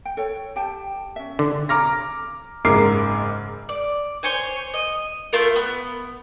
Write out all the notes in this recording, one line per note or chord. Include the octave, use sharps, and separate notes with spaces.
G5
A4 C#5 G5
G4 G5 A5
C#4 E5
D3
A#5 D6 F6 A#6
F#1 G#2 A#4 D6 C7
D5
C5 C#5 G#5
D#5
A3 F4 A#4
B3